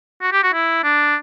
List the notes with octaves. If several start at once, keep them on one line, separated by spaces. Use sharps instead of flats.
F#4
G4
F#4
E4
D4